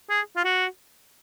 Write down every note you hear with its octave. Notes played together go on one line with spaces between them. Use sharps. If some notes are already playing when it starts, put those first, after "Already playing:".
G#4
F4
F#4